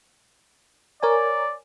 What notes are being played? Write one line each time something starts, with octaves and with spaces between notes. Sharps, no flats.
A#4 C#5 D5 G#5